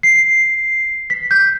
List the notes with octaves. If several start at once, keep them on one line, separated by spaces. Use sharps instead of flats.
C7
B6
G6